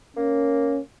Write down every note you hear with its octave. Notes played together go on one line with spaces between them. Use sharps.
A#3 C#4